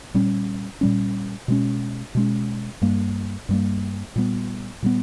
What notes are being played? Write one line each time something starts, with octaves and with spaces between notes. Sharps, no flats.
A#2 G3 C#4
A#2 G3 C#4
B2 G#3 C#4
B2 G#3 C#4
G2 G3 A#3
G2 G3 A#3
A#2 G3 B3
A#2 G3 B3